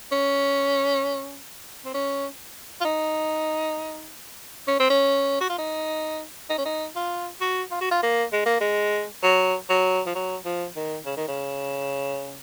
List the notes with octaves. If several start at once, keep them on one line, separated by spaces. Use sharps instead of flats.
C#4
C4
C#4
F4
D#4
C#4
C4
C#4
F#4
F4
D#4
D#4
C#4
D#4
F4
F#4
F4
F#4
F4
A#3
G#3
A#3
G#3
F#3
F#3
F3
F#3
F3
D#3
C#3
D#3
C#3